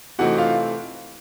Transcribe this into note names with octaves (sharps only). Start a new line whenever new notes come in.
C3 E3 A3 C4 D#4 F#4 F#5
F4 F5